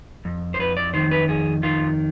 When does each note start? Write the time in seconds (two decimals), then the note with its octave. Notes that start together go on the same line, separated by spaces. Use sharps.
0.25 F2
0.54 C5
0.59 F2 B4
0.77 D5
0.94 D#3 C5
1.11 B4
1.28 F2 G#4
1.63 D#3 F4